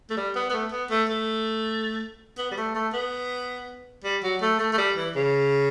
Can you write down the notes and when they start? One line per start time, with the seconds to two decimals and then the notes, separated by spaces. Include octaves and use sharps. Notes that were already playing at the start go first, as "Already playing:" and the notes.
0.10 A3
0.17 G3
0.35 B3
0.50 B3
0.53 A3
0.72 B3
0.91 A3
1.09 A3
2.38 B3
2.51 G3
2.57 A3
2.75 A3
2.93 B3
4.04 G3
4.23 F#3
4.42 A3
4.59 A3
4.73 A3
4.78 G3
4.96 E3
5.16 C#3